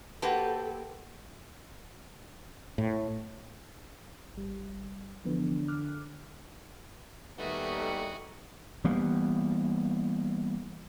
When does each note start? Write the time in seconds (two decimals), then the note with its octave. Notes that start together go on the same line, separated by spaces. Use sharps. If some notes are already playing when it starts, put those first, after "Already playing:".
0.22 A#3 F#4 G4 A4 B4 C5 A5
2.78 A2
4.35 G#1 G3
5.25 D3 E3 F3 B3
5.68 D6 F6 F#6
7.38 D#2 D#3 G3 A3 B3 F#4 G#4
8.84 E3 G3 A#3 B3